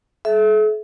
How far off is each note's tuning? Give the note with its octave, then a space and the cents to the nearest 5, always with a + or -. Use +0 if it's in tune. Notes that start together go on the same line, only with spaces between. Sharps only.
A4 -45 E5 +0